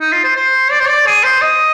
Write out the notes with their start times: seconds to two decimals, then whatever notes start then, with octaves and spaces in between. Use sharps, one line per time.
0.01 D#4
0.12 F4
0.24 C5
0.36 C5
0.71 D5
0.80 C5
0.88 D5
1.07 G#4
1.24 C5
1.42 D#5